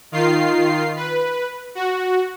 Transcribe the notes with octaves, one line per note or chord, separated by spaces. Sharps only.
D#3 F4 C7
B4
F#4